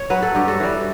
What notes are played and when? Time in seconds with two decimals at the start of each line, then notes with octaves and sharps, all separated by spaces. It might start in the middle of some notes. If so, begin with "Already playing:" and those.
Already playing: C#5
0.10 F#3 B4
0.22 A4
0.35 G2 G4
0.48 F#4 A4
0.60 E3 G3